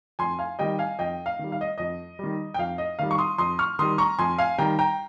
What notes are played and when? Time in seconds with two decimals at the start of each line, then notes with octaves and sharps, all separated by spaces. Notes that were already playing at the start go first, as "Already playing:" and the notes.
0.19 F2 G#5 C6
0.39 F5 G#5
0.59 D#3 G3 D#5 G5
0.79 F5 G#5
0.99 F2 D#5 G5
1.26 F5
1.39 D#3 G3
1.52 F5
1.61 D#5
1.78 F2 D#5
2.19 D#3 G3
2.54 G5
2.59 F2 F5
2.78 D#5
2.99 D#3 G3 F5
3.11 C#6
3.18 C6 D#6
3.38 F2 C6 D#6
3.59 C#6 F6
3.79 D#3 G3 C6 D#6
3.98 A#5 C#6
4.19 F2 G#5 C6
4.38 F5 G#5
4.58 D#3 G3 G5 A#5
4.79 G5 A#5